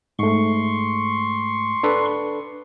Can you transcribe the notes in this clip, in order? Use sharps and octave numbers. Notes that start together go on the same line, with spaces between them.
G#2 A3 C6 C#6
D4 A4 B4